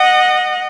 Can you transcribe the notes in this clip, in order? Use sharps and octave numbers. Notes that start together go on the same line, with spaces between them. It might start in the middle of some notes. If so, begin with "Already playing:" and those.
Already playing: D#5 F#5